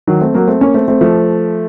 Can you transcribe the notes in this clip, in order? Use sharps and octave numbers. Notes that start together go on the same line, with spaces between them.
D#3 F#3
A3 C4
F#3 A#3
A3 C4
A#3 C#4
A3 C4
A3 C4
F3 A3